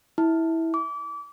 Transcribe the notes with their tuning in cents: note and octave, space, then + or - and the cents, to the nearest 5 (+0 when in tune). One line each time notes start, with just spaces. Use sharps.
E4 -15
D6 -30